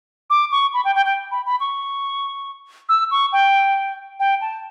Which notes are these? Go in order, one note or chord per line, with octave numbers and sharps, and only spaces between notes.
D6
C#6
B5
G5
G5
G5
B5
B5
C#6
E6
C#6
G5
G5
A5